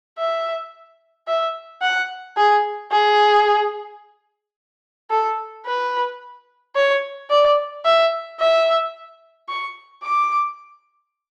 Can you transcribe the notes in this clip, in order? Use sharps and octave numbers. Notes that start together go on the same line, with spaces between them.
E5
E5
F#5
G#4
G#4
A4
B4
C#5
D5
E5
E5
C#6
D6